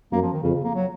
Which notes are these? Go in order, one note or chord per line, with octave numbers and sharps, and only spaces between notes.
F#2 A#3
F3
D#3
F2 C#3
C#3
A#3
F#3